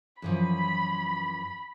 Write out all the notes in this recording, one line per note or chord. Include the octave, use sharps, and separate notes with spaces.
F#2 E3 F3 B5